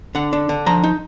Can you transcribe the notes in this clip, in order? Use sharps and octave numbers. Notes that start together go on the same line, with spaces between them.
D3 F#5
D4
D3
F3 A#5
D#4